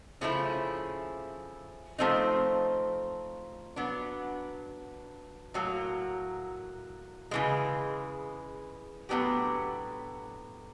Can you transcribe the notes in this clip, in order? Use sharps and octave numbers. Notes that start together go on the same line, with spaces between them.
C#3 F3 A3 C#4 E4
F3 A3 C4 D#4
F#3 B3 D4
A2 F#3 A#3
C#3 E3 G#3
A2 F#3 B3 D4 G4